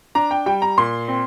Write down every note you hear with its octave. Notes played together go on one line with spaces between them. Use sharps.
D4 A#5
G5
G3 G5
A#5
A#2 C6
C4